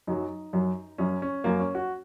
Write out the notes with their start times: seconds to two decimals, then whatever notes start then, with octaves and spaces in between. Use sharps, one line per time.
0.07 F#2 F#3 D#4
0.53 F#2 F#3
0.98 F#2 F#3 C#4
1.22 C#4
1.44 F#2 F#3 A#3
1.60 C#4
1.75 F#4